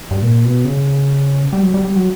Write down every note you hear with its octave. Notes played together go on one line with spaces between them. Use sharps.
G2
A#2
B2
C#3
G3
F#3
G3
G3
F#3